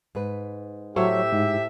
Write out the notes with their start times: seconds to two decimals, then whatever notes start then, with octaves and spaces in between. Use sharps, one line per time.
0.15 G#2 B4
0.96 A2 F#3 G4 A4 C5 C#5 E5
1.32 G#2